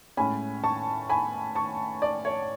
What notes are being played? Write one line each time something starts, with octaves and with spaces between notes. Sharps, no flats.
A2 G#3 C#4 G#5 B5
A5 C#6
G#5 B5
A5 C#6
D5
C#5